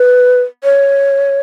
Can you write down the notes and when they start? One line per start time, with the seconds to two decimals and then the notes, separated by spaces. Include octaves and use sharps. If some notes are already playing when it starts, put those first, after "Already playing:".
Already playing: B4
0.64 C#5